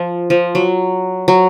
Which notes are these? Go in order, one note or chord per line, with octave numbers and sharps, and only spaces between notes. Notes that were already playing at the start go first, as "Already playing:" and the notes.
Already playing: F3
F3
F#3
F#3